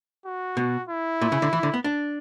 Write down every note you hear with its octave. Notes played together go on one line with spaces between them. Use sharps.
F#4
B2
E4
A#2
C#3
D3
E3
D3
B3
D4